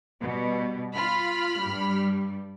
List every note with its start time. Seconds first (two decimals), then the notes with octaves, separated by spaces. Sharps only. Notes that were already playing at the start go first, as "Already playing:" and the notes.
0.21 B2 G3
0.95 F4 B5 F6
1.61 G2 G3